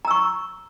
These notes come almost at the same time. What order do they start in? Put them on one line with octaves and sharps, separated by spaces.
A#5 E6 C#6